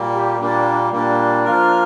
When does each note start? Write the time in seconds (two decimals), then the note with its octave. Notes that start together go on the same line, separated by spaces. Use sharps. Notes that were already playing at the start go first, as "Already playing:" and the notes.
Already playing: A#2 G3 A#3
0.13 G4
0.39 A#2 G3 A#3 D4
0.92 A#2 G3 A#3 D4
1.45 F3 A#3 F4 A#4